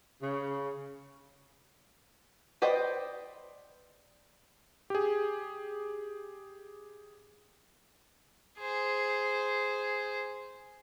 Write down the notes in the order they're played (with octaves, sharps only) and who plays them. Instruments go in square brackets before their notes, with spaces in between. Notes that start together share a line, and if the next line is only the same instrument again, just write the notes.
[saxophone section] C#3
[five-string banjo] B4 C5 D5 D#5 G5
[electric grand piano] G4 G#4
[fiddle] G#4 C5